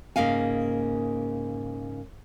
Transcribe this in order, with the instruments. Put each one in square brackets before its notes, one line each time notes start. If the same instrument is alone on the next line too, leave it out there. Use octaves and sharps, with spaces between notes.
[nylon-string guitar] G#2 C#3 A#3 F5 G#5